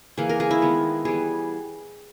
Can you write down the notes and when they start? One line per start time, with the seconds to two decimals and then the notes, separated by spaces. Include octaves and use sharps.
0.18 E3 A#3 G#4
0.29 A#4
0.40 G#4
0.51 E4
0.62 D#3 G#3 B3
1.05 E3 G3 B3 G#4